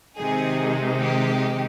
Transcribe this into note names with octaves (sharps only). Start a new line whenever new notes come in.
C3 D#3 G#3 D#4 G#4
G4